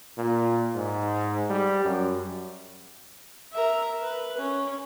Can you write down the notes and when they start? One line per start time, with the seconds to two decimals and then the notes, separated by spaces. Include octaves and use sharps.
0.18 A#2
0.75 G#2
1.50 G3
1.85 F#2
3.52 A#4 E5
4.02 B4
4.38 C#4